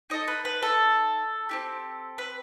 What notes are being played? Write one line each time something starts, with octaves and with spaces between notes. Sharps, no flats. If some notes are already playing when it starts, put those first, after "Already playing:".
D#4 A4 D#5
B4
B4
A4
C4 E4 G4
B4